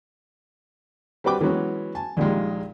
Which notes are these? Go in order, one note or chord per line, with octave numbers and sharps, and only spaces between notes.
G3 C4 F#4 B4 G5 D6
E3 F#3 G#3 B3 C#4 F#4
G#5 A5
A#1 A#2 D#3 G3 G#3